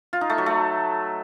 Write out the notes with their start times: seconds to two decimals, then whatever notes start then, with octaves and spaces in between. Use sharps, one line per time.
0.13 F4
0.21 D#4
0.30 A3
0.38 F#3
0.46 A3